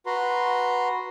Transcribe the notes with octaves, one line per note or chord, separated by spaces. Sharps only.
F#4 B4 A#5 C6